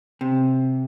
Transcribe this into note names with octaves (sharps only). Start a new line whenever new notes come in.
C3